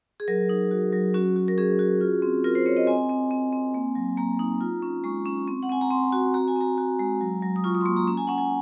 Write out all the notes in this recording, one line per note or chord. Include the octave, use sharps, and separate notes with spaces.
G#4
F#3 A#4
D#4
F#4
F#3
C#4 F#4
F#4
A#4
C#4 G#4
F#4
F4
C4
F4 A#4
C5
C4 C#5
D#5
C4 G#5
C4
C4
C4
A#3
F#3
A#3 A#5
D#4
F4
C#4
G#3 C#6
C#4
C4
F#5
C4 G#5
A#5
C4 C6
F#4
F#4 A#5
G#5
C4 A#5
F#4
G#3
F#3
F#3
D#6
F4 C#6
D#6
C6
A#3 C#6
A#5
C#4 A#5
G#5
C#4 F#5
G#5